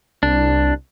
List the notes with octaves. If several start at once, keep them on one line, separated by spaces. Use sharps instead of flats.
C2 D4